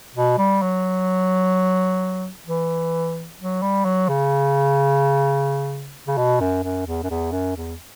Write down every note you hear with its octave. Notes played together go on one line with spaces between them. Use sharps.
B2
G3
F#3
E3
F#3
G3
F#3
C#3
C#3
B2
F#2
F#2
E2
F#2
E2
F#2
E2